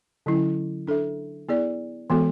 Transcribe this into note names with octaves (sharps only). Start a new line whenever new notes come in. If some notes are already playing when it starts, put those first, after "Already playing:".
D3 F#3 C#4 E4
D4 A4 E5
B3 E4 G#4 D5
E3 G#3 B3 F#4 A4